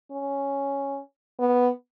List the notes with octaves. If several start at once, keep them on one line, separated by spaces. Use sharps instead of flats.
C#4
B3